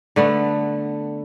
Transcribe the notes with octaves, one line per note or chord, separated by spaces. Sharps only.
D3 A3 B3